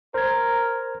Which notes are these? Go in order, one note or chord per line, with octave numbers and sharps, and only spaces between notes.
A#4 C5 G#6